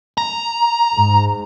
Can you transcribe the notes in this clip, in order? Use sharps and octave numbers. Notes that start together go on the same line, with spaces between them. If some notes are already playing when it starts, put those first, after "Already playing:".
A#5
G#2